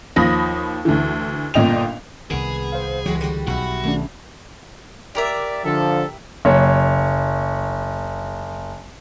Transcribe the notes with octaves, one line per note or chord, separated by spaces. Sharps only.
D#2 F3 B5 D#6 A#6
D2 D3 E3
G1 A#2 D4 D#5 G5 F7
C2 D#3 B3 G#4
C5 F5
C#2 E3 F#3 G#3 F#4 G4
D3 G3 F#4 G4
B1 D#4 E4 F#4
F#2 D#3 A3 D4
G4 A#4 D5 E5
D3 F3 A4
F#1 C#5